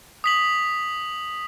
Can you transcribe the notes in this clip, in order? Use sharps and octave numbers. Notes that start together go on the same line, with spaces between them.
D#6 B6 F#7